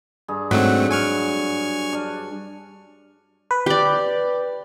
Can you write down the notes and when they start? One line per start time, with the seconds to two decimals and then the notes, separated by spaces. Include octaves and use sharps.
0.28 G2 G#4
0.51 G#2 F#3 A3 C4
0.91 G#5 C#6 F6
1.93 D4
3.51 B4
3.66 G4 D5